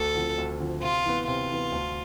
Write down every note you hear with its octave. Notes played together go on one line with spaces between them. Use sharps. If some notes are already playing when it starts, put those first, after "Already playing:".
Already playing: D2 A4
D3 F3 C4
D2
D3 F3 C4
C3 F4
E3 B3
C3 F4
E3 B3
D2